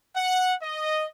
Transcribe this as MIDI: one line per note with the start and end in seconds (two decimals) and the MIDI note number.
0.15 0.53 78
0.61 1.04 75